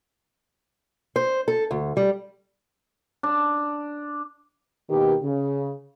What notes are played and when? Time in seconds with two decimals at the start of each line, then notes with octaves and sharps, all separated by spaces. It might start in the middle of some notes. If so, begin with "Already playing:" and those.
1.16 C5
1.48 A4
1.71 D2
1.97 G3
3.23 D4
4.90 B2 D#3 A#3 B3 G4
5.23 C#3